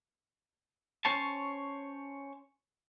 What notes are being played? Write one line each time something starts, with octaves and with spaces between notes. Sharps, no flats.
C#4 C5 C#5 A5